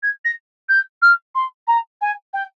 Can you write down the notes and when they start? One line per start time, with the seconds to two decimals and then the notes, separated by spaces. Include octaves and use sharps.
0.02 G#6
0.24 A#6
0.68 G6
1.02 F6
1.34 C6
1.67 A#5
2.01 G#5
2.33 G5